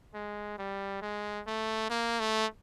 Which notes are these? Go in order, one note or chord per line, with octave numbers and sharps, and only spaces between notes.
G#3
G3
G#3
A3
A#3
A3